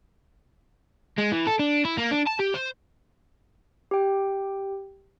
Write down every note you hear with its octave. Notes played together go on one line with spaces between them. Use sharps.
G#3
E3
A4
D4
E4
A#3
D4
A5
G4
C5
G4 G5